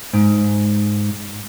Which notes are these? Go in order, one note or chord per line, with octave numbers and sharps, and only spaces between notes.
G#2